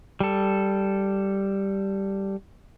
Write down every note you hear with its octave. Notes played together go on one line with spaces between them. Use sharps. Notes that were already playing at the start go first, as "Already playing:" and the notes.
G3 A4